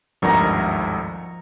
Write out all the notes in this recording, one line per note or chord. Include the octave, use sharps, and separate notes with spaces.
G#1 D2 G2 F3 A#4 D#5 A#5 C#6